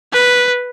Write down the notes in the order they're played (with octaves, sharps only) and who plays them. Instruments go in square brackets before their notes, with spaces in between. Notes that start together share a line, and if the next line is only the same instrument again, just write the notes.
[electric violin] B4